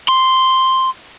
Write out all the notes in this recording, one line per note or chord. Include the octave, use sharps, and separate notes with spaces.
C6